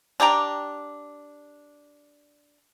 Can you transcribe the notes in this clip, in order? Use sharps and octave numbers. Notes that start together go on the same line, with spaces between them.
D4 G4 G5 A#5